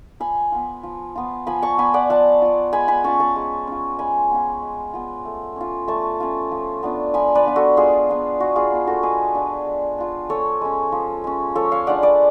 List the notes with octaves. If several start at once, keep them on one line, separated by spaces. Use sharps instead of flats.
F3 G#5 B5
B3 F4
F3
B3 F4
F3 G#5 B5
A5 C#6
B3 F4 G#5 B5
D5 F#5
F3 F#5 A5
B3 F4
G#3 G#5 B5
G#5 B5
C#4 F4 A5 C#6
A5 C#6
G#3
C#4 F4
G#3 G#5 B5
B3 F4
G#3
B3 F4
A3
C#4 F4
A3 A5 C#6
C#4 F4
F3
B3 D4 F4
F3 G#5 B5
B4 D5
B3 D4 F4
F#4 A4
G#3 F4 G#4
B3 D4 F4
G#3 F#4
F4 G#4
B3 D4 F4
F#4 A4
G#3 G#4 B4
D4 F4
G#3
D4 F4
F3 A4 C#5
G#3 C#4
F3
G#3 C#4
F3 A4 C#5
C#5 F5
G#3 D4 F4 D5 F#5
B4 D5